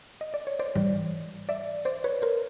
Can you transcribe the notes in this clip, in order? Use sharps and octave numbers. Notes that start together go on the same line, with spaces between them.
D#5
D5
C#5
C5 D5
G#2 E3 G3
D5 E5
C5 D5
B4 C#5
A#4 C5